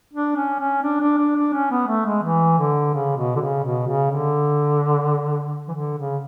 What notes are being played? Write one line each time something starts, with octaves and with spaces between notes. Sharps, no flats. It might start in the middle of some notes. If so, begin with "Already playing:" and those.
D4
C#4
C#4
D4
D4
D4
D4
C#4
B3
A3
G#3
E3
D3
C#3
B2
D3
C#3
B2
C#3
D3
E3
D3
C#3